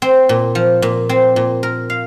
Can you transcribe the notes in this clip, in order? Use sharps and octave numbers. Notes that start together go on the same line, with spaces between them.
C4
A#2
F3
A#2
C4
A#2
A#4
F5